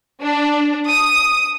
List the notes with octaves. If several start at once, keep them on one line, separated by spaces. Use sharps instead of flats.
D4
D#6